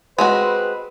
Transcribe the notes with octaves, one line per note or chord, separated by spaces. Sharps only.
G#3 C4 F#4 B4